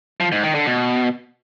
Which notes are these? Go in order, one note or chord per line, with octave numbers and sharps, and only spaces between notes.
F3
G#2
D#3
D3
B2